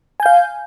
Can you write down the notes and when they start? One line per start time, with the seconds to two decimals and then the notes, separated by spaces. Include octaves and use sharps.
0.20 G#5
0.23 G6
0.26 F5